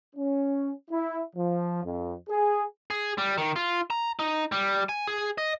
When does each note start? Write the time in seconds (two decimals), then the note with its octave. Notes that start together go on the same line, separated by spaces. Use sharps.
0.16 C#4
0.90 E4
1.36 F3
1.84 F2
2.29 G#4
2.90 G#4
3.18 G3
3.38 D#3
3.56 F4
3.90 A#5
4.19 D#4
4.52 G3
4.89 G#5
5.07 G#4
5.38 D#5